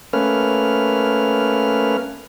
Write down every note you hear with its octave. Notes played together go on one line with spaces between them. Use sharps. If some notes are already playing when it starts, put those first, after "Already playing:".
A3 A#3 C#4 B4 F6